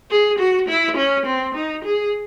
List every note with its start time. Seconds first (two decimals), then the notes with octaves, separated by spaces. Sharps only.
0.11 G#4
0.39 F#4
0.69 E4
0.96 C#4
1.26 C4
1.54 D#4
1.84 G#4